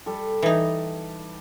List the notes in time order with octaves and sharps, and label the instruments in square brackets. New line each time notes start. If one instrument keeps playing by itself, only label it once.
[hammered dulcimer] G3 A4
[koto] E3 D#4